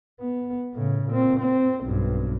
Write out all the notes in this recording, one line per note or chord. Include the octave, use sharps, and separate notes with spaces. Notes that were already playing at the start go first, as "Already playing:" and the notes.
B3
A2 C#3
A#2 C4
C4
B1 G2